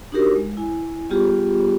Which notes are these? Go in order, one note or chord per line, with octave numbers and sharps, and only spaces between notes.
D4 D#4 F#4 G4 A#4
G#3
E4 G#5
G3 B3 F4 G4 G#4